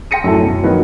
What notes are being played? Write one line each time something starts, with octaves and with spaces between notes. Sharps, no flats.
G5 C6 A#6 C#7 D#7
F#2 A3 E4 A5
F#2 B2
D#3 F3 F#3 B3